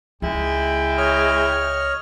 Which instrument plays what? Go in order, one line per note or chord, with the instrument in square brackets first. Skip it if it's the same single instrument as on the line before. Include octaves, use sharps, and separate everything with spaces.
[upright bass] C#2 [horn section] G#3 E4 G5
[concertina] C#5 D#5 F6